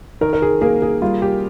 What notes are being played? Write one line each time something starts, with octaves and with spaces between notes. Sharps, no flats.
D#3 A#4
A#4
G#4
A#3 G#4
G#4
G3 F4
G4